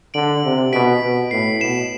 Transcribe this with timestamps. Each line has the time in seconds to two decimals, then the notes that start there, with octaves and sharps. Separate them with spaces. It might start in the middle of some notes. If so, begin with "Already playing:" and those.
0.14 D3 D7 F#7
0.44 C3
0.73 B2 B6 D7
1.03 B2
1.31 A2 C7
1.60 B2 C7 E7